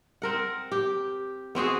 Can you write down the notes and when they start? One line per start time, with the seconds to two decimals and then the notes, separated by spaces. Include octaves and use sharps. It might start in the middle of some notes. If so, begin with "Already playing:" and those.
0.22 C4 A#4 F#5
0.72 G4
1.55 B3 C4 F#4 G#4